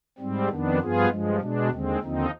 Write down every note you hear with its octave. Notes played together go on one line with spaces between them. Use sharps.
G#2 G3 C4
F2 D#3 B3 D4
G2 F3 B3 F4 G#4
G2 F3 G#3
B2 G#3 D4
D#2 D3 G#3 C4
D#2 D3 F3 C4 D#4